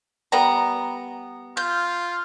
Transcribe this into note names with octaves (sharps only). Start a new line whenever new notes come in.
G3 B3 A#5
F4 G6